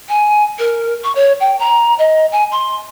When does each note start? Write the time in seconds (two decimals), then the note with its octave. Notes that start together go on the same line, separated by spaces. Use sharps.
0.09 G#5
0.59 A#4
1.04 C#6
1.15 C#5
1.40 G5
1.59 A#5
1.98 D#5
2.32 G#5
2.51 C6